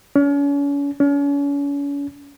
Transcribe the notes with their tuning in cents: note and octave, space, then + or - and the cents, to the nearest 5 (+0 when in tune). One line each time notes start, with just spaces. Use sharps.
C#4 +40
C#4 +40